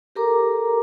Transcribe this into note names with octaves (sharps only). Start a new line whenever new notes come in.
G4 A4 A#4 A#5 D6